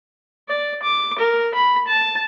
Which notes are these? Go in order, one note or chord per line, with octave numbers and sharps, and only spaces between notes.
D5
D6
A#4
B5
A5